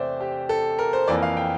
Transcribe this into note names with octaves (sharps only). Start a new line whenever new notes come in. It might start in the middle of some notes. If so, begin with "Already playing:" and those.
Already playing: E2 C3 A3 C5 D5 E5 G5
G4
A4
A#4
C5
F2 E3 A#3 D5
F5
G5